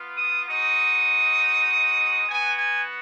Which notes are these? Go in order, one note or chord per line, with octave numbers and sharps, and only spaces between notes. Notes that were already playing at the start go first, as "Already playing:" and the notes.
Already playing: B3 F4
D#6
G#3 D#4 F#4 D#6
B3 F#4 G#5
G#5